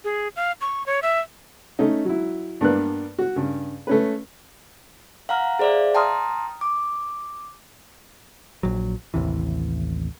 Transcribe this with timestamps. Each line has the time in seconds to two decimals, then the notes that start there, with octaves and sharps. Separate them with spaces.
0.04 G#4
0.36 F5
0.61 C#6
0.86 C#5
1.02 E5
1.79 A3 C#4 D#4
2.05 F#3 E4
2.61 G2 A#3 B3 D4 F#6
3.19 F#4
3.36 G2 C#3
3.87 A3 C#4 B4
5.29 F5 F#5 A#5 F6
5.59 G#4 C5 D5 E5 F5
5.95 G5 A5 A#5 C6 D#6 F6
6.61 D6
8.63 A#1 F#3
9.14 A1 D#2 C3 E3